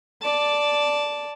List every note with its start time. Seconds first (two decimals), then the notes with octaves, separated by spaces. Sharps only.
0.22 D5 A5